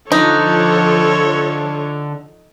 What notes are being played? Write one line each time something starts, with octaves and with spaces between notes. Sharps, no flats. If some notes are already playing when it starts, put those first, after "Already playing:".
D3 F3 D#4 A4 C#5